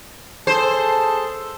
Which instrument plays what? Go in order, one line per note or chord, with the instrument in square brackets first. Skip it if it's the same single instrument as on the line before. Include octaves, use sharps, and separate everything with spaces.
[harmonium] G#4 A4 A5 [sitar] C5